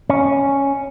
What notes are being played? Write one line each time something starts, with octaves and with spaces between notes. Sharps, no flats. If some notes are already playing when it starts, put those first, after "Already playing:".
C#4